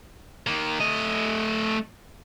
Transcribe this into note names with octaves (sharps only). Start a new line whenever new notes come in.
D#3 A#3
A3 D#5